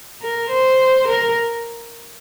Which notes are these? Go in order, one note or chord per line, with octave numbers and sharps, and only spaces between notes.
A#4
C5
A#4